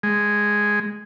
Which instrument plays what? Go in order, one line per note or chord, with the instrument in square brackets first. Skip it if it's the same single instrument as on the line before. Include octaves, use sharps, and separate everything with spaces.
[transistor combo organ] G#3